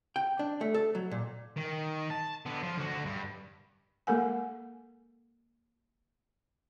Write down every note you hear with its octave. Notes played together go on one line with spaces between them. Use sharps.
G5
D4
A3
A4
F#3
A#2
D#3
A5
D3 B3
F3
D3 F#4
G2
G#3 A#3 A4 A#4 F#5 G#5